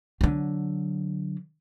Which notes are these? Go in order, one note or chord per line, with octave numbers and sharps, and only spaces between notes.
D3 F#3